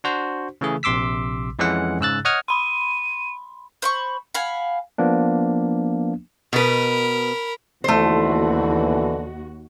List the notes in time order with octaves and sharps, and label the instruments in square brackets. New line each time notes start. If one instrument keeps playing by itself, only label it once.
[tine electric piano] D4 F#4 C5
C#3 E3 A3 G#4
A#1 C3 C6 D6 E6 B6
F2 E3 G#3 C#4 F#5
G#2 C#3 E6 F#6 A6
C#5 D#5 F#5 D#6 F6 G#6
[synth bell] B5 C6 [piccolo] D#7
[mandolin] C5 B5 C#6
F5 F#5 G#5 B5
[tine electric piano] F3 A#3 B3 D4
[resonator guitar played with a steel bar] B2 B4 [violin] A#4 B5
[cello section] D#2 F#4 [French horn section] B2 D3 E3 [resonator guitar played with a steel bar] A3 C5